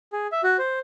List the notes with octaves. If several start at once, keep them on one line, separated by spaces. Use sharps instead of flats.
G#4
E5
F#4
C5